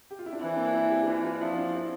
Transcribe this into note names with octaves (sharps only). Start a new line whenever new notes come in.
G4
F4
E4
D4
E3 C4
A#3 D4
C4 E4
E4 G4
G4
E3 D4 F4
D4 F4
F3 C4 E4
D4 F4
C4 E4